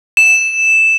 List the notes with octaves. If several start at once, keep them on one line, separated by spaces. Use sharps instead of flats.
E7